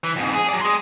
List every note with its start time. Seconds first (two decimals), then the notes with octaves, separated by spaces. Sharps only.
0.04 E3
0.16 F2 G#2
0.34 G#4
0.49 F#3 D5
0.61 G#4 C6